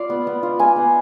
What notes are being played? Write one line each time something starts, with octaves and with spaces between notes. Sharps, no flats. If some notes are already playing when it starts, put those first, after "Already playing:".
Already playing: F4 D5 F5
B3
B3
F4
F4 G#5
B3